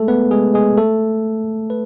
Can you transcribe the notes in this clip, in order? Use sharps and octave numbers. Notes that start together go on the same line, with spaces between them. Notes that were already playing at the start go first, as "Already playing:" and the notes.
Already playing: G#3 A3 G#4 A4
B3 B4
G#3 G#4
G#3 G#4
A3 A4
B4